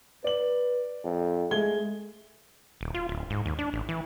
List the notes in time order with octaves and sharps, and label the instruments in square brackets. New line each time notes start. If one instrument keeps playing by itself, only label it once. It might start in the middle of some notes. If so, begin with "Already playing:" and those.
[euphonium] B4 [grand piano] D5 F#7
[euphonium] F2
[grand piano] G#3 G#6 G7 [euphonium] A3
[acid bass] D#1
F4
D1
G#2
D#2
D4
A1
E3